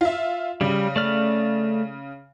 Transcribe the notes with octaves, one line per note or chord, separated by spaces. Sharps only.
F4 E5
C#3 G3
A3 D5 F6